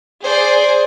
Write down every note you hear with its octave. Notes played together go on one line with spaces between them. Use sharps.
G#4 C5 D5